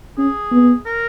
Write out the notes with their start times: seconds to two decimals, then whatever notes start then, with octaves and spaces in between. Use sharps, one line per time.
0.18 C#4 G#4
0.52 B3
0.86 A#4